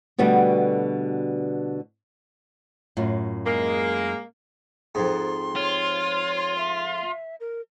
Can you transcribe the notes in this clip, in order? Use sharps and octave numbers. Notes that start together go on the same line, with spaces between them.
B2 D3 G3 A3 B3 F#4
F#2 A2 F4
G#3 A#3
F2 G#2 C6
F4 C#5
E5
A#4